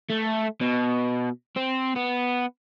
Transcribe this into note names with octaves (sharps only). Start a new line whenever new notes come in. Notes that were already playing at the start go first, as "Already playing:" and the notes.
A3
B2
C4
B3